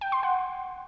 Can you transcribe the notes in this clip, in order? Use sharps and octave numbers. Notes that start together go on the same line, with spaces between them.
G5
C6
F#5